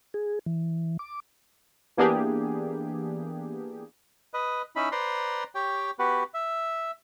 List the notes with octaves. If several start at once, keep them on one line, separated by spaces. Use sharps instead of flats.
G#4
E3
D6
E3 A#3 B3 D4 G4 G#4
B4 D#5
C#4 D#4 E4 B5
B4 C5 D5 A#5 C6
G4 C#5 G5
B3 F#4 G4 B4
E5